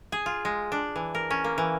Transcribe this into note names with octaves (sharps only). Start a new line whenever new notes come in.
G#4
F4
G#3
D4
E3
A#4
C#4
A#3
E3